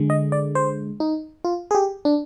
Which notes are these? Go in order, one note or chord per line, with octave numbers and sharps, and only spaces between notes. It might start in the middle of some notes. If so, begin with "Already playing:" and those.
Already playing: D3 G#3
D#5
D5
C5
D#4
F4
G#4
G4
D4